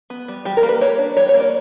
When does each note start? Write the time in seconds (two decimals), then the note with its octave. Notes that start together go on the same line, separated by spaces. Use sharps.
0.10 B3
0.28 G3
0.45 G3 G4
0.57 A#4
0.63 A#3
0.69 B4
0.81 A#3 C#5
0.98 D4
1.17 G3 C#5
1.29 C#5
1.34 A#3
1.40 D5